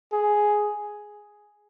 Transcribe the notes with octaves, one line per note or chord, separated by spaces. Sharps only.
G#4